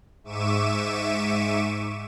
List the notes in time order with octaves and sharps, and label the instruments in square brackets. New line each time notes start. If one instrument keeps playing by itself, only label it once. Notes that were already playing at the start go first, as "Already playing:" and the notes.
[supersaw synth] G#2 E5 C#6 D6 D#7 E7